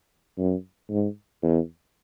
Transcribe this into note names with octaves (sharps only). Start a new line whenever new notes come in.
F#2
G#2
E2